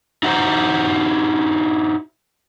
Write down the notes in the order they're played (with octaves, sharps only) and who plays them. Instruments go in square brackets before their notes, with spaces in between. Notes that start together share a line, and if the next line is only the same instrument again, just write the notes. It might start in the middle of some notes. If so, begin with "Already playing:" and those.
[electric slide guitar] D#4 E4 F#4 B4 C5 A#5